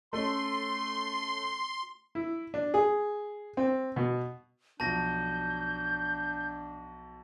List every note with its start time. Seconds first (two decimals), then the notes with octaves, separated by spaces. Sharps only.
0.13 A3 C#4 C6
2.15 E4
2.54 D4
2.74 G#4
3.57 C4
3.96 B2
4.80 B1 F3 D4 A5 G6 A#6